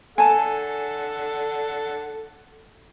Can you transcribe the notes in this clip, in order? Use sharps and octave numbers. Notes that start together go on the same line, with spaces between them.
A4 F#5 G#5 A5